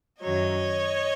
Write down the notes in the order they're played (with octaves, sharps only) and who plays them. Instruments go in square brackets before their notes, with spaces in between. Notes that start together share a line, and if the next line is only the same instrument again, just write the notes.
[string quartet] F#2 D#3 F#3 C#5 D#5